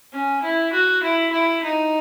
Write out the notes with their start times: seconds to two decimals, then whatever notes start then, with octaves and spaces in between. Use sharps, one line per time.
0.13 C#4
0.43 E4
0.72 F#4
1.03 E4
1.32 E4
1.63 D#4